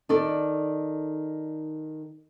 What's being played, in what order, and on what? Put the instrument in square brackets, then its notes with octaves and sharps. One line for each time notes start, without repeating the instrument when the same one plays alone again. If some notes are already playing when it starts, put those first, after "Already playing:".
[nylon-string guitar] D#3 A4 D5